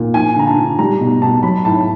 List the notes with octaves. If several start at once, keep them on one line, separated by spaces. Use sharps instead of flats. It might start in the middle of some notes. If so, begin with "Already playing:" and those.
Already playing: A#2
F3 G#5
D3 A#5
A5
D3
G3 A#5
B2
B2 A5
F#3 B5
A2 A5